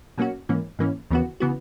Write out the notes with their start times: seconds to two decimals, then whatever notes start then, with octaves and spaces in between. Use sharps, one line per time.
0.18 B2 F#3 A#3 C#4 F#4
0.49 G#2 E3 A#3 C#4
0.79 G#2 E3 A#3 C#4
1.11 D#2 C#3 E3 B3 F#4
1.40 C#3 E3 B3 F#4